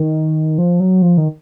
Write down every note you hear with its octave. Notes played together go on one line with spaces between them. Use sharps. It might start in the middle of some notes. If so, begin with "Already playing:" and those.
Already playing: D#3
F3
F#3
F3
D#3